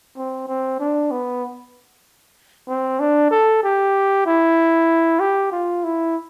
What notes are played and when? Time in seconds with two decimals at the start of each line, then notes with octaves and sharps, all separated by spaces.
0.17 C4
0.48 C4
0.80 D4
1.11 B3
2.68 C4
3.00 D4
3.31 A4
3.63 G4
4.27 E4
5.20 G4
5.52 F4
5.84 E4